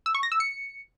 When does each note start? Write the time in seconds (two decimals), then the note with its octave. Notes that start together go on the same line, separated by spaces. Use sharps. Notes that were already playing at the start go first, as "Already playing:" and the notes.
0.06 E6
0.15 C#6
0.23 A#6
0.32 E6
0.40 C#7